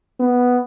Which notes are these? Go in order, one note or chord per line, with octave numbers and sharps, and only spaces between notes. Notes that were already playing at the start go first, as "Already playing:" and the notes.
B3